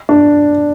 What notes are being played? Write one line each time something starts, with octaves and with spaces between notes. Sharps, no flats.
D4